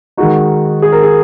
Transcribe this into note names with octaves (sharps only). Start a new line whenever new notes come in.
D#3 G#3 D#4 F#4
G#4
A#4
G#4